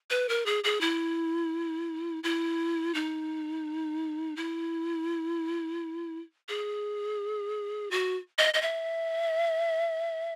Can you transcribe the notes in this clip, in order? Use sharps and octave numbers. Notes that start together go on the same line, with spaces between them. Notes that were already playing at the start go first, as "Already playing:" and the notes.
B4
A#4
G#4
G#4
E4
E4
D#4
E4
G#4
F#4
D#5
D#5
E5